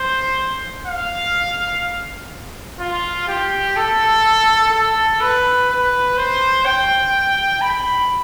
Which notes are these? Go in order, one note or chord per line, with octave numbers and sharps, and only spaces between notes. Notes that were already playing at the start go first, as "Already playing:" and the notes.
Already playing: C5
F5
F4
G4
A4
A4
B4
B4
C5
G5
B5